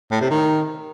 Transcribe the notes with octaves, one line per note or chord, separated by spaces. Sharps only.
A2
C3
D#3